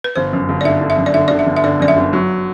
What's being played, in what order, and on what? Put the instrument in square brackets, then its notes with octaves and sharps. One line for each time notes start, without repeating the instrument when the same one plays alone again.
[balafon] B4
[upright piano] G1 [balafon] C5
[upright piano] F#2
G1
[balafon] D5
[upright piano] D3 [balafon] E5
[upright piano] D3
[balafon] E5
[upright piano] F#2
[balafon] D5
[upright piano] D3 [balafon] E5
[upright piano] D3 [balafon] D5
[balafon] E5
[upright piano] G1
[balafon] E5
[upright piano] D3 [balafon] D5
[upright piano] F#2 [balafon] D5
[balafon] E5
[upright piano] G1
F#3